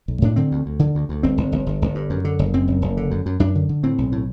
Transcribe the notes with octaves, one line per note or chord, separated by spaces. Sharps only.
B1
A2 D4
D3 C4
D2
D2
D3
D2
D2
G1 C4
G1
G1
G1
G1
G2
F#2
D3
F#1
F#2 C4
F#1
F#1
D3
F#2
F#2
F#2 D4
D3
D3
A2 C4
B1
A2